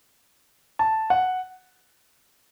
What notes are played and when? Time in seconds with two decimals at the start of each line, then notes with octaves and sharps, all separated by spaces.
0.79 A5
1.10 F#5